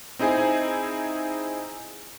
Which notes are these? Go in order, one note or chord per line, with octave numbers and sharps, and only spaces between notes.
C4 D#4 E4 G#4 C5 G#5